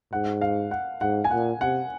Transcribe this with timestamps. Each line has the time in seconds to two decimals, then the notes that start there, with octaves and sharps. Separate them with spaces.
0.13 G#2 F#5
0.41 F5
0.71 F#5
1.01 G#2 F#5
1.24 G#5
1.31 A#2 F#5
1.61 C3 F#5